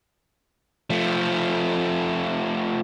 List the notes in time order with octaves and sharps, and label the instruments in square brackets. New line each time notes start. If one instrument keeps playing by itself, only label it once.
[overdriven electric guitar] F3 A3